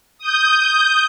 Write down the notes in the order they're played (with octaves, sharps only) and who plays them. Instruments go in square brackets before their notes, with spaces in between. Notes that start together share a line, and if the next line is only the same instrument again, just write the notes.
[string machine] D#6 G6